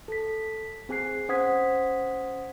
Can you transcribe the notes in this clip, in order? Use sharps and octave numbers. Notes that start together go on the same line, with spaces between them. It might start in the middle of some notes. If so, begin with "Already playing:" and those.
A4 B6
C4 G#4 G#5 F#6 C7
C#4 C5 F#5 D#6 G#6 B6